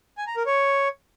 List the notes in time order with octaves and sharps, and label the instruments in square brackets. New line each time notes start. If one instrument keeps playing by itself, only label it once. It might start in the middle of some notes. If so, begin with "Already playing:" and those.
[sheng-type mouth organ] G#5
A#5
A#4
C#5